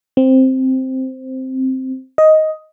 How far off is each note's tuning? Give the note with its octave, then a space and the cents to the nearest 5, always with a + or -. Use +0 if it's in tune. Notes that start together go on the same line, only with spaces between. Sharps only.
C4 +0
D#5 +10